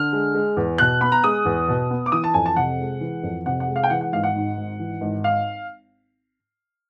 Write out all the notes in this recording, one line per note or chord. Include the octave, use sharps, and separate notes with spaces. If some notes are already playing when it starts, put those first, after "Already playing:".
Already playing: D3 F6
G#3
G#3
E2
B2 F#6
B3 B5
A#5
G#3 D#6
E2
B2
B3
D6
E3 D#6
A5
F2 G#5
A5
C3 F#5
G#3
E3
F2
C3 F#5
F#5
G#3
F5
G5
E3 F#5
F#5
G#1 F5
F#5
G#2
G#1
E3
G#1
F5